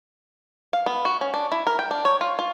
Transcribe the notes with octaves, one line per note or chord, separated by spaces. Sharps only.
F5
B3
F#4
C#4
D4
E4
A#4
G5
D4
C#5
F4
F4